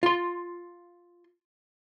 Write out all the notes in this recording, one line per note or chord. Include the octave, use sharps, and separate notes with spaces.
F4 C6